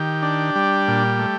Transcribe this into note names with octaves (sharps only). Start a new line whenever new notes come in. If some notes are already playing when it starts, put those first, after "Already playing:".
Already playing: D#3 G4
D4
G3
A#2
A3